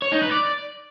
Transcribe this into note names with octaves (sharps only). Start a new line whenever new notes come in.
C#5
D#4
B4
D5